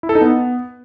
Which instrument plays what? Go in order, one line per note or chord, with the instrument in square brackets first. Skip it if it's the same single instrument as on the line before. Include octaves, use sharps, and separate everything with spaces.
[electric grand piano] E4
A4
D#4
B3